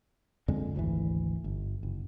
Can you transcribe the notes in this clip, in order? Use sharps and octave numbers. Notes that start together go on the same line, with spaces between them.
F2 D3 G#3
G#1 D2 D#3 E3
G1
F#1